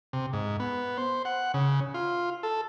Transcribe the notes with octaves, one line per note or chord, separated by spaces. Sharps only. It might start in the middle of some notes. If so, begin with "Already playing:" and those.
C3
G#2
B3
C5
F#5
C#3
F4
A4